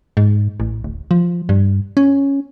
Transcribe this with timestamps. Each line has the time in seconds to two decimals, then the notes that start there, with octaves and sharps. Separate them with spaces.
0.17 G#2
0.60 A1
0.84 D1
1.11 F3
1.49 G2
1.97 C#4